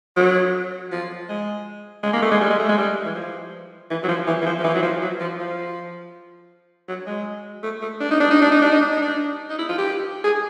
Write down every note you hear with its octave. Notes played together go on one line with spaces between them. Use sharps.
F#3
F3
G#3
G#3
A#3
A3
G#3
G3
G#3
A3
G#3
G3
E3
F3
E3
F#3
F3
E3
E3
F3
F3
E3
F#3
F3
F#3
F3
F3
F#3
G#3
A3
A3
D4
D#4
D4
D#4
D4
D#4
D4
D#4
D4
D#4
D4
D#4
E4
F4
G4
G#4